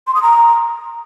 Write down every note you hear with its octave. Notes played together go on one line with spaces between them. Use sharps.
C6
D#6
A#5